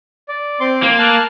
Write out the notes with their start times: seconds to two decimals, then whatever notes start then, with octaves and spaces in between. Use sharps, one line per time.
0.29 D5
0.60 C4 C6 D6
0.83 A#3
0.99 A5 F6 F#6